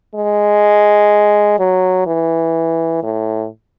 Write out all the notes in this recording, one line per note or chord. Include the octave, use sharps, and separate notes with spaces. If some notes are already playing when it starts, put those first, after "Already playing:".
G#3
F#3
E3
A2